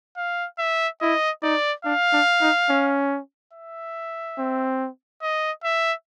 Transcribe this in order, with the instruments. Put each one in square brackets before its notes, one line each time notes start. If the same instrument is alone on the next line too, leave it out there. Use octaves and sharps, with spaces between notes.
[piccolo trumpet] F5
E5
[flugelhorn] E4 [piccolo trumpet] D#5
[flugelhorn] D#4 [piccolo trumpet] D5
[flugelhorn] D4 [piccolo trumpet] F5
[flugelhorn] D4
D#4
C#4
[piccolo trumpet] E5
[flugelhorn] C4
[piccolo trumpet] D#5
E5